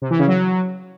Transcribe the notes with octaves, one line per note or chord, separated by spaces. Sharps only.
C3
E3
C#3
F#3